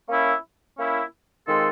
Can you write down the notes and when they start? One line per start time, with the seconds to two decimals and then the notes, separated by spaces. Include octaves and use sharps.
0.09 A#3 C#4 E4
0.78 A#3 C#4 E4
1.45 D#3 G#3 C4 F4 A4